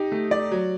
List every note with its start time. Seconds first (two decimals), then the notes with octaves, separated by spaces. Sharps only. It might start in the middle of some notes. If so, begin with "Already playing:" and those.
Already playing: D#4 G4
0.12 A3
0.31 D5
0.51 F#3